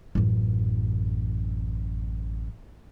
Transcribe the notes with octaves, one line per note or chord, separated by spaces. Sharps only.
A1 F#2